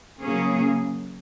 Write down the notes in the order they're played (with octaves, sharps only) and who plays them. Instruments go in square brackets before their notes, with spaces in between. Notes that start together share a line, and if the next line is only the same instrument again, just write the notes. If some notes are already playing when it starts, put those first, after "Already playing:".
[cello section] C#3 F#3 A#3 C#4 G#4